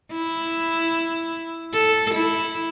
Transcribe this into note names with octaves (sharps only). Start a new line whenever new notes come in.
E4
A4
E4